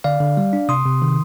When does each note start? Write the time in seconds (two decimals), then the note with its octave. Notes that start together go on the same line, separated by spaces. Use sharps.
0.04 D3 D5 F5
0.21 D3
0.37 G3
0.53 D4
0.69 C3 C6 D#6
0.86 C3
1.02 D#3